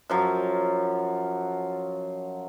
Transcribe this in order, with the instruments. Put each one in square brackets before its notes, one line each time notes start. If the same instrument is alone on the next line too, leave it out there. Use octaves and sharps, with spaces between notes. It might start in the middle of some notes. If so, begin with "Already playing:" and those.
[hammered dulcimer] F#2 F3 F#3